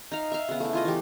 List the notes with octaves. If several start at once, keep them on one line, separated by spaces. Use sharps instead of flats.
D#4 F5
E5 F5
C#3 B3
A3 E4
E4 F4 D#5
E3 G4